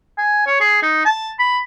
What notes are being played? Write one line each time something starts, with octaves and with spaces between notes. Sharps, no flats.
G#5
C#5
G#4
D#4
A5
B5